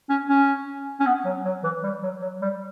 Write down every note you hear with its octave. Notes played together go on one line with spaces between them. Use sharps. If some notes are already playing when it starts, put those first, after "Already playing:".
C#4
C#4
C#4
B3
F#3
F#3
E3
G3
F#3
F#3
G3